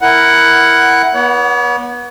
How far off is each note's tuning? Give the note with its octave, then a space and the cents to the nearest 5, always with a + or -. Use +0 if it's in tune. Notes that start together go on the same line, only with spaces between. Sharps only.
E4 +0 A#4 +0 F#5 +10
B3 -25 C#5 +40